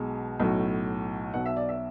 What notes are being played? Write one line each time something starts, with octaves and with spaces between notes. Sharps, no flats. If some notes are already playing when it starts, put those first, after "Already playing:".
Already playing: B1 B2 G#3
B1 A2 F#3
B1 B2 F#3 F#5
E5
D5
E5